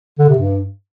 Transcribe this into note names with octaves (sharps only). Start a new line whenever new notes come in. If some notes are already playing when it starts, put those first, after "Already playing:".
D3
C3
G2